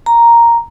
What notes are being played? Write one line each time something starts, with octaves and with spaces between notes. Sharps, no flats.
A#5